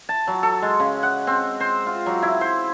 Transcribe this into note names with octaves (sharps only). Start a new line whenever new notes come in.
A5
F#3
A4
G#3
C#3
F#5
C4
C5
F4
F#3
E4
C5